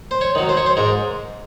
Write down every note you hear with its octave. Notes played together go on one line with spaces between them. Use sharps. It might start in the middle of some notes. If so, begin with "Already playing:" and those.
C5
C#5
D#3 F#3
C5
C#5
C5
G#2 A#4